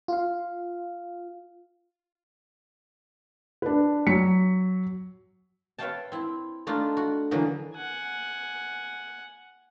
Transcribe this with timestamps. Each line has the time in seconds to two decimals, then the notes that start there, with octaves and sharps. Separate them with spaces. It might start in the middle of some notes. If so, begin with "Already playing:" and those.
0.08 F4 F5
3.62 D4 B4
4.07 F#3 B6 C#7
5.78 B4 C#5 E5 F5 G5 A5
6.12 C4 E4
6.67 A3 D4 D#4 F4
6.97 F#4
7.31 D3 E3 F#3 A#3 D#4
7.75 F#5 G#5